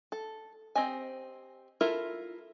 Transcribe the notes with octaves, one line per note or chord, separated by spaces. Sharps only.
A4
C4 G4 D#5 G#5
E4 F4 A4 A#4 E5